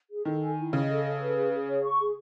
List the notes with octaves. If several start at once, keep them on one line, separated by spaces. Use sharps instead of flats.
G#4
D#3 A4
G#5
E4
C#3 D#5
A4
A4
B4
G#4
G#4
C#5
C#6
G#4